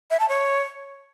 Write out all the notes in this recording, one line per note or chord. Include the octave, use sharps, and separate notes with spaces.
E5
A5
C#5